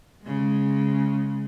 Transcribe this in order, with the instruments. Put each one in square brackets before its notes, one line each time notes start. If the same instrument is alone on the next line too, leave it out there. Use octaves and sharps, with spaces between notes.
[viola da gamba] C#3 G#3